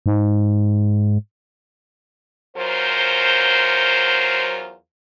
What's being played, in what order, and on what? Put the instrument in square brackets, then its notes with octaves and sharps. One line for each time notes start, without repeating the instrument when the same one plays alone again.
[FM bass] G#2
[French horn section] E2 F#3 F4 A#4 C5